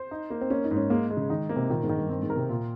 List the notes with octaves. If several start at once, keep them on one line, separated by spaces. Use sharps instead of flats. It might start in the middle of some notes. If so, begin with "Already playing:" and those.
Already playing: C5
D#4
A#3
C4
A#3 C#4
D#4
G#2
C#4
G#3 A#3
G#3
C#3
D#3 D#4
A#3
C3
A#2 D#3
G#2
D#3
G2
G2 C4
G#2
A#4
C3
A#2 F4